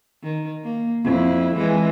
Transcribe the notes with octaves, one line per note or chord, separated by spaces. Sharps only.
D#3
A#3
F2 E4
E3 G#3